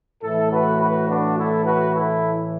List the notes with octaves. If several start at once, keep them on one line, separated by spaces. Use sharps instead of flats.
A2 E3 A3 E4 A4
F#4 B4
F#4 B4
D4 F#4
E4 A4
F#4 B4
E4 A4